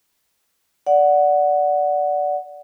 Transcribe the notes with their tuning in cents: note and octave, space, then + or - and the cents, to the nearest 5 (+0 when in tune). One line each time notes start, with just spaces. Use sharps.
D5 -10 F#5 +0